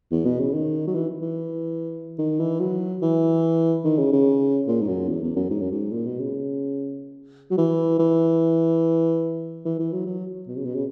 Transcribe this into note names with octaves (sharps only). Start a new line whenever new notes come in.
E2
B2
C#3
D#3
F#3
E3
E3
D#3
E3
F#3
E3
D#3
C#3
C#3
A#2
G#2
F#2
E2
E2
F#2
G#2
F#2
G#2
A#2
B2
C#3
F#3
E3
E3
E3
E3
F#3
F#3
B2
C#3
B2
C#3